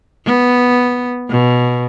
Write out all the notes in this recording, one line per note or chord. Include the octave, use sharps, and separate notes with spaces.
B3
B2